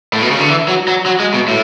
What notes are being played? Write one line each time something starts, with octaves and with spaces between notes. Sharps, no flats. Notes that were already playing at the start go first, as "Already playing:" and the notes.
A2
B2
C#3
D3
E3
F#3
F#3
F#3
G#3
B2
A2